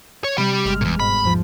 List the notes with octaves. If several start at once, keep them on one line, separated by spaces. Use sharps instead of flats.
C#5
C3 G3 G4 B5
G1 G#3 F6
E2 A#2
G#2 B2 B5
E2 G#2 F3